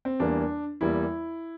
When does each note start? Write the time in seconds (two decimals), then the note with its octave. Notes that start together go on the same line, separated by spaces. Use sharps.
0.05 C4
0.20 E2 E3 G3 A#3 D4
0.81 E2 E3 G3 A#3 E4